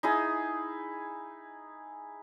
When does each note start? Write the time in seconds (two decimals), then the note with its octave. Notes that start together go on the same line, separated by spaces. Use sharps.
0.03 D#4 E4 G#4